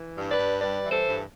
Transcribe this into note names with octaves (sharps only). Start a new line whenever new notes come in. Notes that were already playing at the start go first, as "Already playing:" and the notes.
Already playing: E3
G2
B4 D5
G2
G3 B4 D5
E3
A4 C5
G2